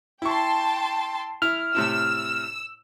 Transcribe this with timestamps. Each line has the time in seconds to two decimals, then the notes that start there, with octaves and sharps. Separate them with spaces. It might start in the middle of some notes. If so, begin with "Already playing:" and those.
0.22 E4 G5 A5 C6 C#6
1.42 E4 F6
1.75 A2 C3 E4 E6